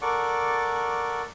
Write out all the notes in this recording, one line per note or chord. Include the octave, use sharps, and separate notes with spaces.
A4 A#4 D5 F#5 C#6 D6